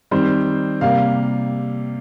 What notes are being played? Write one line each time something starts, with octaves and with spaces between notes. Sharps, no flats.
D#3 G3 C4 C5
C3 G3 A#3 F5